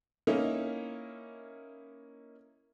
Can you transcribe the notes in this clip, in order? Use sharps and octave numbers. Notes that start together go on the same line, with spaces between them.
A#3 C#4 D#4 E4